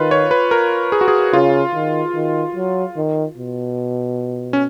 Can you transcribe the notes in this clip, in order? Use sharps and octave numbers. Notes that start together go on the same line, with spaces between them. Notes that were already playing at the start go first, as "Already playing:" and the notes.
Already playing: D#3 F4 B4
C#5
B4
A#4
G#4
F#4
G#4
C#3 F4
D#3
D#3
F#3
D#3
B2
C#4